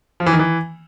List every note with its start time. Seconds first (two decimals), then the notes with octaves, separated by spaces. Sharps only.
0.20 F3
0.26 E3
0.33 D#3
0.39 E3